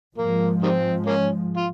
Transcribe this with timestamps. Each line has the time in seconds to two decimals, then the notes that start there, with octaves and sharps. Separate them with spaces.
0.18 G#2 F3 G#3 A#3
0.63 D#3 G3 C4
1.07 A#3 C#4
1.57 F4